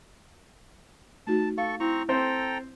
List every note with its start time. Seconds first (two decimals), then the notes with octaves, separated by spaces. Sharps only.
1.27 A3 D#4 F#4 A5
1.58 A4 F5 C#6
1.80 C4 E4 A#5 C#6
2.09 C4 A4 C5 G5 A#5